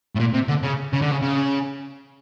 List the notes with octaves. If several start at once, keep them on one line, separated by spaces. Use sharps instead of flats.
A2
A#2
C3
D3
C#3
C#3
D3
C#3
C#3